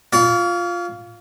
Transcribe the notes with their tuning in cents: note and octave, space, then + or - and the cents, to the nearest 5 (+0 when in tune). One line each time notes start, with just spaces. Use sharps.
F4 +0 C#5 +45